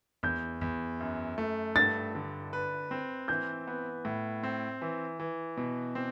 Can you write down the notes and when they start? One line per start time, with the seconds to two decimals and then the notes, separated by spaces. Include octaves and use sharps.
0.23 E2 G6
0.61 E2
1.00 F#2
1.38 A3
1.76 G2 A6
2.15 D3
2.53 B4
2.91 C4
3.28 E3 G6
3.67 B3
4.05 A2
4.43 C4
4.82 E3
5.20 E3
5.57 B2
5.95 C4